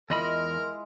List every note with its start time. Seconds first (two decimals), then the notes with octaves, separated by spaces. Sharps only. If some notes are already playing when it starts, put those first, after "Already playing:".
0.10 E2 G#3 E4 F4 A#4 D#5 B5 F6